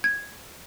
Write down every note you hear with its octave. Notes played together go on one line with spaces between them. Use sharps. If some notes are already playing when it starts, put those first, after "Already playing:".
G#6